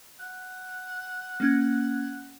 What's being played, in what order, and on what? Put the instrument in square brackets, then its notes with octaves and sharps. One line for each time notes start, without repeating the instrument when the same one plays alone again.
[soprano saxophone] F#5
[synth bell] A#3 C#4 G#6